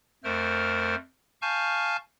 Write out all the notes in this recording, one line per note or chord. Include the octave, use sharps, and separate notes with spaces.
F2 A3 A#4 C5 F6
F5 G#5 A5 C#6 F6 G6